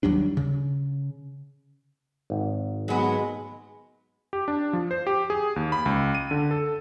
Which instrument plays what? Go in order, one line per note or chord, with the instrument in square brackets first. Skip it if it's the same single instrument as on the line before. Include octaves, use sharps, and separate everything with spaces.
[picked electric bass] D#2 F#3 G3 D4
C#3
[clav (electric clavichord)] G#1 [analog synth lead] G#2
[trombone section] B2 G#3 [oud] F#3 B3
[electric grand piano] G4
D4
F3
C5
G4
G#4
D#2
B5
C#2
D#7
D3
A4